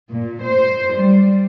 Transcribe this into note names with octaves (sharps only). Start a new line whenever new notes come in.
A#2
C5
G3